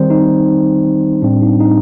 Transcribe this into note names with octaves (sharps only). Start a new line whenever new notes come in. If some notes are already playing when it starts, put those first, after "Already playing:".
Already playing: D#3 G3 C4 C5
D#4
A2 G3 C4 D4
D#4
D#4